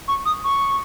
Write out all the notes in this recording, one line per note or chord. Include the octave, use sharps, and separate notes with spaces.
C#6
D#6
C#6